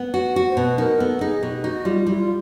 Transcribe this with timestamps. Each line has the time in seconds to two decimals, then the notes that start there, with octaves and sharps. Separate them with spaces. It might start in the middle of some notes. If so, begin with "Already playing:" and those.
Already playing: B3
0.14 F#4
0.36 F#4
0.49 C5
0.57 B2 B4
0.78 D#4 A#4
0.99 B3 A4
1.21 D#4 G#4
1.43 B2 G4
1.64 D#4 F#4
1.85 G3 F4
2.06 G3 E4
2.19 F4